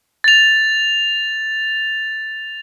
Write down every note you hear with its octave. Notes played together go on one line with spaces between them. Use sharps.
A6 F7